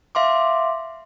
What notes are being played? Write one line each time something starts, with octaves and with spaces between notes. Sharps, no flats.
E5 F5 C6 D6